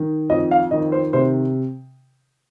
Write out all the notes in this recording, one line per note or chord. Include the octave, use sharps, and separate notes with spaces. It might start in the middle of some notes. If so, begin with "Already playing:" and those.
Already playing: D#3
F2 D#5
F5
D#3 D#5
C5
C3 C5